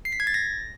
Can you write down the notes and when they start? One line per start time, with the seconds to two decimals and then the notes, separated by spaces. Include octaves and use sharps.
0.05 C7
0.12 B6
0.20 G#6
0.27 A6
0.34 A#6